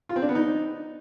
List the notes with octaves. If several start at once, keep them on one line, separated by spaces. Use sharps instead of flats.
F4
C4
D4
B3
D#4